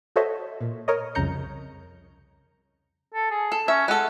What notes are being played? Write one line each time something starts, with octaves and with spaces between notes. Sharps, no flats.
F#4 A4 C5 C#5 D#5 E5
A#2
A#4 C#5 D#5
C2 F2 C#3 A#5 G6 C#7
A4
G#4
A4
C#4 E5
G#3 A4 F#5